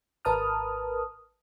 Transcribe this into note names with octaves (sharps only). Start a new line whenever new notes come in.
G#1 A#4 B4 A5 D#6 F6